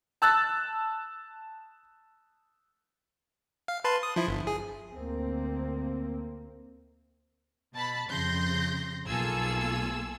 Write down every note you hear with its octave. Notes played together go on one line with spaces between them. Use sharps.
A5 E6 F#6 A6
F5
B4 A5 C6
D#6
F3 E4
G1
G#4
D2 A#3 C4
B2 A5 B5
F2 C#3 C6 G6 A#6
B1 A#3 F4 G#4 A4 E6